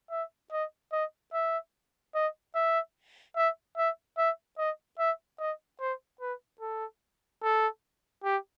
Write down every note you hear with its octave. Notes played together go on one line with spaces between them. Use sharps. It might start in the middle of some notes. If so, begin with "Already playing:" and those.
E5
D#5
D#5
E5
D#5
E5
E5
E5
E5
D#5
E5
D#5
C5
B4
A4
A4
G4